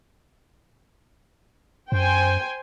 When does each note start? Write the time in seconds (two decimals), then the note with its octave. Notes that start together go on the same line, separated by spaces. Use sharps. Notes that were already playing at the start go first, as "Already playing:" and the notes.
1.92 F#2 C5 G5 G#5